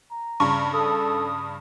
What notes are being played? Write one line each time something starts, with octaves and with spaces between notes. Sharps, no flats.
A#5
G2 C#3 C#6
A4 D#6